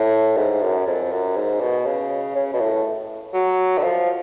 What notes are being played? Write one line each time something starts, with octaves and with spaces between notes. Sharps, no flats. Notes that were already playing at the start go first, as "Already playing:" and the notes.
Already playing: A2
G#2
F#2
F2
F#2
G#2
B2
C#3
C#3
B2
A2
F#3
D3
F3